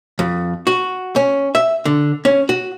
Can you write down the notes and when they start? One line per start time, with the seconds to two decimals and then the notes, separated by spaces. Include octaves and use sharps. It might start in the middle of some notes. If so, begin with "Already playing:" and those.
0.19 F2
0.67 F#4
1.16 C#4
1.55 E5
1.85 D3
2.25 C#4
2.49 F#4